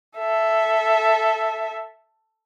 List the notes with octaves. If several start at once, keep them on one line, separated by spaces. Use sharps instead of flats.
A4 E5